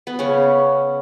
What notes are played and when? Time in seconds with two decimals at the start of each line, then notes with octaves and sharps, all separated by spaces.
0.07 B3
0.19 C#3 C#4